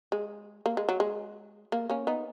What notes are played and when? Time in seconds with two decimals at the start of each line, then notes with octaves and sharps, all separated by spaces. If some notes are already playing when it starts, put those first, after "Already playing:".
0.12 G#3
0.66 A#3
0.77 G#3
0.89 F#3
1.00 G#3
1.72 A#3
1.90 A#3 C#4
2.07 B3 D#4